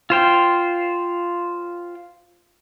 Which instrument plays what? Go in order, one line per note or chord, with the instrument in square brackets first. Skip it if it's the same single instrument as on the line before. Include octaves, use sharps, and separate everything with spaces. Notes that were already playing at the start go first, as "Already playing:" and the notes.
[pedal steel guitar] F4 C5 G5